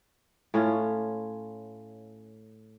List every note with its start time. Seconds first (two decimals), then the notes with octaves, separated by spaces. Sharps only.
0.54 A2 C#4 F4